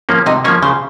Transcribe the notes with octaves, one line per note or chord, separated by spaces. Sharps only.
F3 A#3 C#4
C3 D#4 D#5
F3 A#3 C#4 C#5
C#3 C5